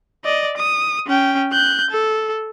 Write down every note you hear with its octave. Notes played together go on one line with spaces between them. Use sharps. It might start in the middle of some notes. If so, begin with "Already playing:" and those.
D5 D#5
D#6
C#4 G5
F#6 G6
A4